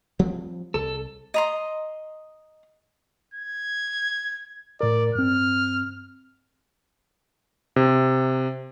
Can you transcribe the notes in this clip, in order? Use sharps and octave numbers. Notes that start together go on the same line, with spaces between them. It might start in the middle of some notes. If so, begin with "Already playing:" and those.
F3 G3 C4
C2 A4
D#5 A#5 C6
G#6
A2 A#4 D5
G2 C4 F6
C3